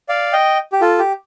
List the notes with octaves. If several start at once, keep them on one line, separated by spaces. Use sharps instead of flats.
D5 F5
D#5 G5
G4
F4 A4
G4